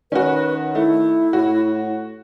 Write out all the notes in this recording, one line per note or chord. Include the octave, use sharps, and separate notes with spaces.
D#3 C#4 F#4 B4
A3 E4
A2 F#4